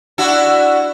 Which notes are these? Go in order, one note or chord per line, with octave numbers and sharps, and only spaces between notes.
D4 E4 F#4